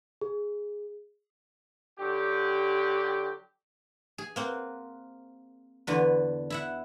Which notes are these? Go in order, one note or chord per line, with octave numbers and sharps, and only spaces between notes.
G#4
D3 F#3 G4
G#4
A#3 C4 F#5
E2 D3 B4
E4 E5 F#5